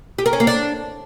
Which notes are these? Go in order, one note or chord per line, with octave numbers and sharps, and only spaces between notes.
G4
A#4
C#4
A#3
D4